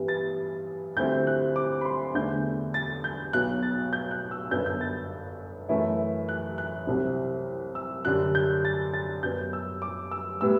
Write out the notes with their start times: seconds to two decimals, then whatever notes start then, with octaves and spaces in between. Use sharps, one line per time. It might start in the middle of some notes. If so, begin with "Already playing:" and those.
Already playing: G2 E3 G3 B3
0.08 A6
0.96 D2 D3 G3 C4 E4 G6
1.27 F#6
1.56 D6
1.81 B5
1.85 C6
2.15 E2 D3 A3 D4 G6
2.74 A6
3.04 G6
3.33 B1 B2 F#3 F#6
3.63 A6
3.93 G6
4.11 F#6
4.31 E6
4.51 G1 F#2 F#3 B3 D4 G6
4.66 G6
4.81 A6
5.69 F#2 E3 A3 E4
6.29 F#6
6.58 F#6
6.87 C2 C3 F#3 C4 E4
7.75 E6
8.05 F#2 D3 G3 D4 F#6
8.35 G6
8.65 A6
8.94 A6
9.23 F#2 F#3 B3 G6
9.53 E6
9.82 D6
10.11 E6
10.41 A2 G3 B3 E6